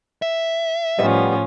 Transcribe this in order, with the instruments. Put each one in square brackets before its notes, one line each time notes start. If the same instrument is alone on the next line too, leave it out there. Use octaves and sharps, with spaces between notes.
[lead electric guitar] E5
[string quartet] A2 F3 C#4 [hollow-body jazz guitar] G3 B3 D#5